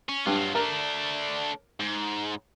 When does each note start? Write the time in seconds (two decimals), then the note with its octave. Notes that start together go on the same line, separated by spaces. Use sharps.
0.09 C#4
0.26 G2 F#3 F4
0.55 A3 D4 A#4
1.80 G#2